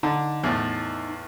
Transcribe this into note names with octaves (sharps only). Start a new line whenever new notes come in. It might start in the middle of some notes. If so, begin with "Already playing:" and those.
D3 D#4
E2 A2